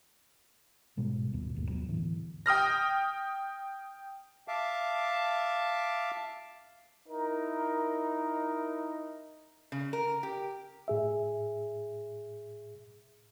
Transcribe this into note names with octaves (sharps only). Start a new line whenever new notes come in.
G#2 B2 G3 G#3
G#1 D#2 B2
G#1 D#2 G#2 A#3
D#2 F#3 B3
A2 D3 E3
G5 D#6 F6 A#6
E5 F5 A5 D6
D#4 E4 A#4
C#3
A#4
G4
A2 G#4 E5